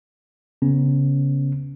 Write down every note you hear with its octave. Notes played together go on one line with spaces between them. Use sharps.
C#3 B3 C#4